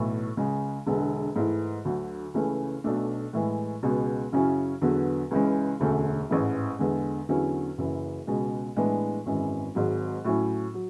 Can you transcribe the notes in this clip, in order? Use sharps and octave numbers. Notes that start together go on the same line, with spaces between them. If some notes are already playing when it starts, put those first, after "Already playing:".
Already playing: B1 A2 E3
C#2 C#3 G#3
E1 E2 D3 G#3
G#2 E3 A3 E4
D2 D3 F#3
C#2 C#3 E3 A3 C#4
B1 B2 A3 D4
A2 E3 G#3
C#2 B2 G#3 B3
F#2 C#3 F#3 C#4 E4
E2 D3 F#3 B3
C#2 C#3 E3 G#3 C#4
E1 D2 D3 A3 C#4
A1 G#2 E3
E2 D3 G#3
E2 D3 F#3 C#4 E4
F#1 F#2 E3
C#2 B2 G#3
A2 E3 G#3 B3 D4
G#1 F#2 E3 G#3
G#1 G#2 F#3
A2 F#3 C#4 E4
F#3